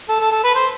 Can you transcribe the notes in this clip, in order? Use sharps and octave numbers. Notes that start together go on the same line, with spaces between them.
A4
A4
A4
B4
C5